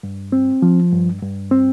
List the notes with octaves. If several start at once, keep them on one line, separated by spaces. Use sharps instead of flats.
G2
C4
F3
G2
G2
C4